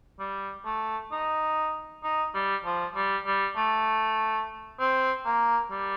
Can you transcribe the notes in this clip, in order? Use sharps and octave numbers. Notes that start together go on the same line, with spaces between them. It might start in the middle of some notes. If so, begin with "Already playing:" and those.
G3
A3
D#4
D#4
G3
F3
G3
G3
A3
C4
A#3
G3